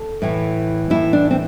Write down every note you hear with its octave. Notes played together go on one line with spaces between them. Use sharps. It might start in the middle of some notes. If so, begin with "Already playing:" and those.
Already playing: A4
A2 E3
A2 E3 E4
D4
C4